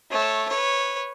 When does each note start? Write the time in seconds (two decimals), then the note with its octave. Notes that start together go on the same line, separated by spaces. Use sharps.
0.11 A3 C#5
0.49 B4 C#5